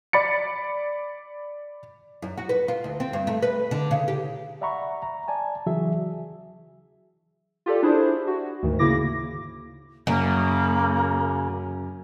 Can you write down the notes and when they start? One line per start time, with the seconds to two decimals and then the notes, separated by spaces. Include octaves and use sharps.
0.13 D5 B5 A6 C#7
2.22 F#2
2.38 F#4
2.49 B4
2.68 F4
2.84 D2
3.00 C4
3.13 G2
3.27 A3
3.42 B4
3.71 D3
3.91 C#3
4.08 G4
4.61 D5 E5 F#5 A#5 B5 C#6
5.03 A#5
5.28 D5 G#5 A5
5.66 C#3 E3 F#3 F#4 G#4 E5
7.66 F4 G4 A4 D5
7.83 D4 E4 G#4 C5
8.27 F#4
8.63 D2 G#2 D#3
8.79 C#3 A#3 E4 D6 A#6
10.07 F#2 C#3 A#3